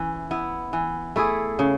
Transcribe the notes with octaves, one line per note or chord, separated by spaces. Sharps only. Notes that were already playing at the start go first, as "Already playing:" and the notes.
Already playing: E3 C#4
B3 E4
E3
A3 E4 G#4
C#3